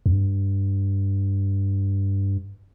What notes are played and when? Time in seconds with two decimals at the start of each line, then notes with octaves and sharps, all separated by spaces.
0.06 E2
0.12 G2